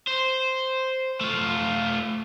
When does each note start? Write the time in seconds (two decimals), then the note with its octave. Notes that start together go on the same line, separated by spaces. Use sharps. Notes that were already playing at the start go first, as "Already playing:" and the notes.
0.08 C5
1.21 A3 F4